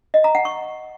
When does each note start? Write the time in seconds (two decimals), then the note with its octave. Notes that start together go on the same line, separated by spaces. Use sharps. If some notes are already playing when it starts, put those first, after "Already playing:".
0.14 D#5
0.24 A#5
0.35 F#5
0.45 C#6